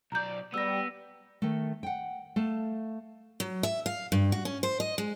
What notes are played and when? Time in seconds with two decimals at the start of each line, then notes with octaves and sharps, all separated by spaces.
0.12 B1 D5 A#5 G6
0.54 G3 B3 E6 A#6
1.42 D#3 A3
1.83 F#5 G5
2.36 A3 F5 A5
3.40 F#3
3.63 E5
3.86 F5
4.12 G2
4.32 F#4
4.45 C#4
4.63 C5
4.80 D#5
4.98 G#3